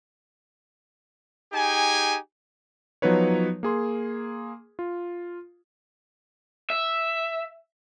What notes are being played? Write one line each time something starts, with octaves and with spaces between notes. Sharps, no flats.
D#4 G4 G#4 G#5
F3 F#3 B3 D#4 B4 C#5
A#3 G#4 C6
F4
E5